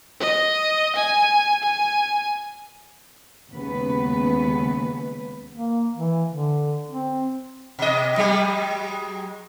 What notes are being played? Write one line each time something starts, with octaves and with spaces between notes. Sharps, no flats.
D#5
G#5
G#5
D#2 C#3 G#3 B3 B4
A#3
E3
D3
C4
B2 D#5
F#3 G#3 G4